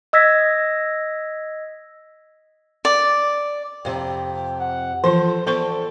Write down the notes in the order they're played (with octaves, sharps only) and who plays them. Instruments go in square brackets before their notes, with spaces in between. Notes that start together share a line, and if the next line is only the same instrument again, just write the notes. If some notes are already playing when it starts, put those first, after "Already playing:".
[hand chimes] D#5 E6 G#6 A#6 B6
[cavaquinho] D5
[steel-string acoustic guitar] F2 C3 [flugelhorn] G5
[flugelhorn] F#5
[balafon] E3 F3 F4 [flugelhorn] A4 [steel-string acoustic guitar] C5
[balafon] B3 C5 C#6 [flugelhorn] A4 [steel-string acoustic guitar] D5